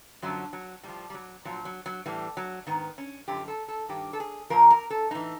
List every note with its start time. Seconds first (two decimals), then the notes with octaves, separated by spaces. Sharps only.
0.22 F#2 D3 F3 F#3
0.53 F#3
0.83 A2 F3 G3
1.10 G3
1.14 F#3
1.45 A#2 F3 F#3
1.65 F#3
1.86 F#3
2.06 A2 E3 G3
2.37 F#3
2.67 G#2 D#3 B3
2.98 C#4
3.28 F#2 D3 F3 G4
3.48 A4
3.68 A4
3.88 G2 D#3 G4
4.13 A4
4.20 G#4
4.50 A#2 F3 A#4
4.70 A#4
4.90 A4
5.11 A2 E3 D#4